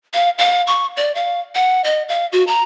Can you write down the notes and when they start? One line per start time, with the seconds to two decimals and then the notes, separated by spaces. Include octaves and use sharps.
0.14 F5
0.39 F5
0.67 C#6
0.97 D5
1.15 F5
1.55 F#5
1.84 D#5
2.09 F5
2.32 F#4
2.47 A#5